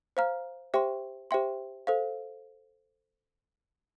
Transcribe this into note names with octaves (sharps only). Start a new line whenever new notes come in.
C5 F5 A#5 F6
G4 C5 E5 G5 C6
G4 C5 E5 G5 C6
A4 C5 F5